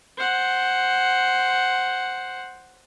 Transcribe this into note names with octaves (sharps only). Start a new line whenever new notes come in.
C5 F#5